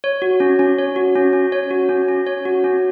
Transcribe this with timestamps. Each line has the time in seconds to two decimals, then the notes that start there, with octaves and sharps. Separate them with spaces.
0.04 C#5
0.22 F#4
0.40 C#4
0.59 C#4
0.78 C#5
0.96 F#4
1.16 C#4
1.33 C#4
1.52 C#5
1.71 F#4
1.89 C#4
2.09 C#4
2.26 C#5
2.45 F#4
2.64 C#4